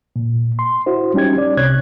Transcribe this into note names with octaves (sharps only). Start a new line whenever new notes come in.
A#2
C6
E4 F#4 C5
G3 C#4 D#4 G4 G#6
D5
C2 C3 C#5 F#6 G#6